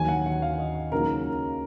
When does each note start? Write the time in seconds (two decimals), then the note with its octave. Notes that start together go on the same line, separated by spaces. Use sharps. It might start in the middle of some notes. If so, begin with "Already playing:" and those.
Already playing: D#2 D#3 F#3 G#5
0.08 F#5
0.26 F#5
0.42 F5
0.59 D#5
0.92 C#2 C#3 F#3 A#3 D#4 A#4